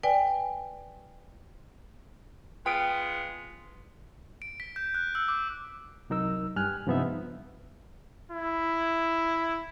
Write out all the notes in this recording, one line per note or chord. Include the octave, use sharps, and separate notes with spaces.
B4 D5 G5 G#5
G#3 B3 F4 G5 D7
D7
B6
G6
F#6
E6
D6
C2 F#3 D#4 A#4 E6
G2 G3 G#5 F6 F#6
G2 C3 F3 B3 D#4 E5
E4